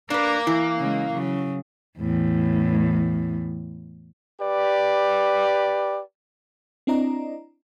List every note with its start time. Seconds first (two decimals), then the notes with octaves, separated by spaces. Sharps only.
0.10 A#3 D4 A#4 B4
0.47 E3 E4
0.79 C#3 G#3
1.13 C#3 F#3
1.99 E2 A2
4.40 G4 B4 D5
6.87 C4 D4 E4 D5 D#5 A#5